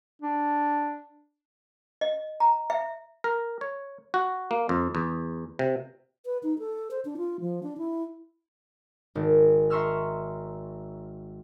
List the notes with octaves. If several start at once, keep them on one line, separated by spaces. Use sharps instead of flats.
D4
D#5
A#5
E5
A#4
C#5
F#4
A#3
F2
E2
C3
B4
D#4
A4
C5
D4
F4
F3
D4
E4
G#1
E5 A#5 C6 C#6 E6 F6